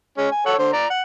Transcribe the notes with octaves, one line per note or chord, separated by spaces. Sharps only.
G#3 C#4
G#5
A4 C#5 F#5
D3 C5
D5 A#5
F#5